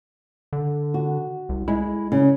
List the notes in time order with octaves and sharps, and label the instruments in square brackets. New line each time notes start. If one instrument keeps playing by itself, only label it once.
[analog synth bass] D3
[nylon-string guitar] F#4
[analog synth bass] C2
[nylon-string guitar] G#3 [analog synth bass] E4
[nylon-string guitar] C#3